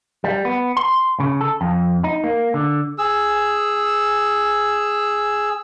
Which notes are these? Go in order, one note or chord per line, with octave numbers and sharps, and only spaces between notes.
G3
B3
C6
C#3
A4
F2
D#4
A#3
D3
G#4 E6